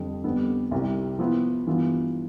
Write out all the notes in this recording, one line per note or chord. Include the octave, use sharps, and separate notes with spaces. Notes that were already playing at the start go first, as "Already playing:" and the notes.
Already playing: F2 D3 G3
F2 D3 G3 B3 D4
C2 C3 G3
F3 B3 E4
G2 E3 B3 F4